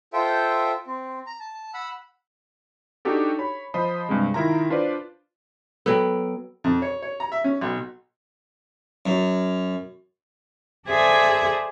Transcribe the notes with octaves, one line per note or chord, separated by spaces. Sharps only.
F4 A4 C5 E5 G5
C4
A#5
A5
F#5 B5 E6
D4 D#4 F#4 G4 A4
C#5 B5
F3 C5 D#5 B5
G2 C3 G#3
D#3 E4 F4 A#4 A#5
D4 F4 B4 C5 D5
F#3 B3 A4 G5
F2
C#5
C#5
A#5
E5
C#4
B1
F#2
G#4 A4 C5 D5 E5 G#5